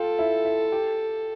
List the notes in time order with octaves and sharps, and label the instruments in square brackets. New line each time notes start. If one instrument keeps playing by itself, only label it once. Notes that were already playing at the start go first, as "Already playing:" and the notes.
Already playing: [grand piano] F4 F5 G5 A5 [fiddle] A4
[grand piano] E4 E5
E4 E5
G4 G5